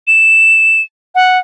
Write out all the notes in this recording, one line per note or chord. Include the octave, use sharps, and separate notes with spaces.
E7
F#5